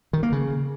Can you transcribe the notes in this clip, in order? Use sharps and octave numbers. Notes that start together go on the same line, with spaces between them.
D#3
A#3
C#3